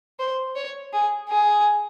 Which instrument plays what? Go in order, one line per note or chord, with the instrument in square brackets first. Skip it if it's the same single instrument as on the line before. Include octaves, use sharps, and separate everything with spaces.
[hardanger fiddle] C5
C#5
G#4
G#4